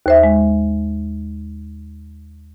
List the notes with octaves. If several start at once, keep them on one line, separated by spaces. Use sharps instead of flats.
D#2 C5 E5
G#3